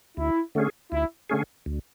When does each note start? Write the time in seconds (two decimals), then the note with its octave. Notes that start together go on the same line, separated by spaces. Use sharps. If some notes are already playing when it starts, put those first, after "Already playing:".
0.17 D2 E4
0.55 D3 A3 C#4 G#4
0.92 D2 E4
1.29 D3 A3 C#4 G#4
1.66 D2